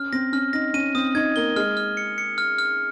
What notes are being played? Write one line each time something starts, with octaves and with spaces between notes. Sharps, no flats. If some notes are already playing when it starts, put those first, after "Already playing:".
Already playing: C#4 F6
C4 A#6
C#4 F6
D#4 A#6
C#4 D#7
C4 D#6
D#4 G#6
A#3 G7
G#3 F6
F6
C#7
C#7
F6
F6